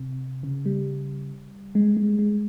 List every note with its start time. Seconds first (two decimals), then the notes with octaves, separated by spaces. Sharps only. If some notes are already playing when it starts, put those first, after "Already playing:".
Already playing: C3
0.43 C#3
0.66 G3
1.75 G#3
1.97 G#3
2.19 G#3